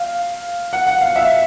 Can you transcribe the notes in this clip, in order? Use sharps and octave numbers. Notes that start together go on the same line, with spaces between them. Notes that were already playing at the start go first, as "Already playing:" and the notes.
Already playing: F5
F#5
F#5
F5
E5